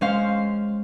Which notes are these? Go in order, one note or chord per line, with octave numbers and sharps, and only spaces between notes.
G#3 C#4 C5 F5